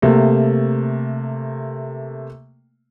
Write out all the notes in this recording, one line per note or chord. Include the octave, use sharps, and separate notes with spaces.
C3 A3 A#3